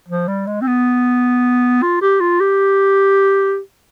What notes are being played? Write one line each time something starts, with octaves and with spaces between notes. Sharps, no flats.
F3
G3
G#3
C4
B3
F4
G4
F4
G4